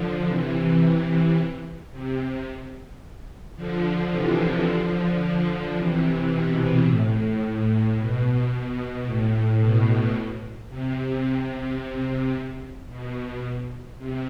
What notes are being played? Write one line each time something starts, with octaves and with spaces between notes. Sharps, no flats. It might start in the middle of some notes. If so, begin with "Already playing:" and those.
Already playing: D3 F3
C3 E3
C3
D3 F3
C3 E3
D3 F3
C3 E3
B2
A2
B2
A2
B2
C3
B2
C3